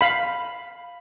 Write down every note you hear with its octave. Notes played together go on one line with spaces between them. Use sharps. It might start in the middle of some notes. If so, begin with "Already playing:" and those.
F5 B5